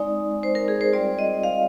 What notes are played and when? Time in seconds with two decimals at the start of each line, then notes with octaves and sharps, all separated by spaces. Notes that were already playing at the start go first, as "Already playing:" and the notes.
Already playing: G#3 C4 D#4 D5
0.43 C5
0.55 A#4
0.68 G#4
0.81 C5
0.93 G3 C4 F4 D5
1.19 D#5
1.43 F5